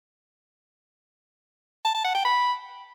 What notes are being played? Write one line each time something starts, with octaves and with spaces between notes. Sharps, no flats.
A5
A5
F#5
G5
B5